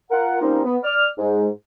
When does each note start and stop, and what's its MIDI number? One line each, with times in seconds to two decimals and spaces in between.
0.11 0.37 65
0.11 0.37 70
0.11 0.37 78
0.41 0.61 53
0.41 0.61 55
0.41 0.61 58
0.41 0.61 60
0.41 0.61 61
0.41 0.61 63
0.64 0.77 59
0.83 1.07 74
0.83 1.07 89
1.18 1.47 44
1.18 1.47 56